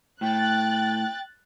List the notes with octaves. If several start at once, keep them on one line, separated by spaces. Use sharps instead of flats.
A2 G5 F#6 A6